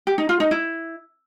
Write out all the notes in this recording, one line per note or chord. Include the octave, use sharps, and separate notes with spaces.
G4
D#4
F4
D#4
E4